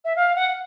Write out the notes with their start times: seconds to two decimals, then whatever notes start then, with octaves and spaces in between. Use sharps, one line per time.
0.05 E5
0.16 F5
0.36 F#5